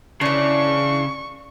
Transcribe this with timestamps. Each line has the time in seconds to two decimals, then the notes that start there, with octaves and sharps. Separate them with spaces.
0.21 C#3 E3 D4 C#6